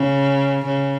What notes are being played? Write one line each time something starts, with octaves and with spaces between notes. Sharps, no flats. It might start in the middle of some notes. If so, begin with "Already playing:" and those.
Already playing: C#3
C#3